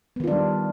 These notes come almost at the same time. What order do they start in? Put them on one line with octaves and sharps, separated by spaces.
B3 D#3 F4 D4 G3